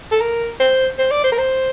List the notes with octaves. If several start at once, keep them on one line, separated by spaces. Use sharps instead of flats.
A4
A#4
C5
C5
D5
C5
A#4
C5